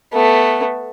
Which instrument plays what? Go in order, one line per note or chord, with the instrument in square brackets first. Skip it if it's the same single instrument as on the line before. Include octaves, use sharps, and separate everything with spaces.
[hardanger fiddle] A3 B3